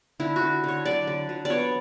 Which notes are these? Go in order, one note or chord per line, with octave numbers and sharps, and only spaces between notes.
D3 E4
F#4
D3
D3 C#5
F#3 D5
D3
F#3
B3 C#5 D5